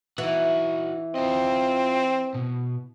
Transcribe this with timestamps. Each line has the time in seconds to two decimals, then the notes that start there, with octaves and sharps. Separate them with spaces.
0.18 E3 D#4 F#4
1.16 C4 F4 D#5
2.35 B2